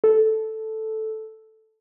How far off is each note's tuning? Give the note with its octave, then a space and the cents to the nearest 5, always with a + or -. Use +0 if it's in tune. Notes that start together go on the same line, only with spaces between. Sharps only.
A4 -5